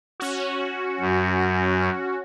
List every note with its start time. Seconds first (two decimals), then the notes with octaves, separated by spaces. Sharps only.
0.20 C#4 F#4
1.00 F#2